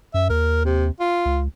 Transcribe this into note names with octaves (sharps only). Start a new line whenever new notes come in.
F#2 E5
D#2 A#4
C3
F4
C#2